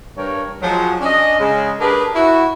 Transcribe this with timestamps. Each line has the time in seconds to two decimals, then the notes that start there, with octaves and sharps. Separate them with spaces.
0.17 G2 A#4 C#5
0.62 F3 F#3 G#3
1.01 C#4 D4 D#5
1.39 C#3 G#3
1.80 D4 G4 G#4 A#4 B4
2.16 E4 F#4